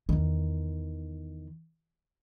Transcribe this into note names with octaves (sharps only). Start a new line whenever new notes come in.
E2 D#3